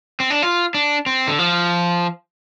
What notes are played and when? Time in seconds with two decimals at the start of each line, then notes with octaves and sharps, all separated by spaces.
0.20 C4
0.30 D4
0.42 F4
0.74 D4
1.06 C4
1.28 D3
1.39 F3